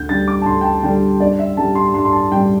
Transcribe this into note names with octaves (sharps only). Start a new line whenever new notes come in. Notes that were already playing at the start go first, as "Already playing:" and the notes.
Already playing: D2 G6
D3 G3 D4 A6
D6
A5
D2 C6
G5
A5
D3 G3 D4 G5
G2 D5
E5
G3 D4 A5
C6
G2 C6
C6
A5
G3 D4 G5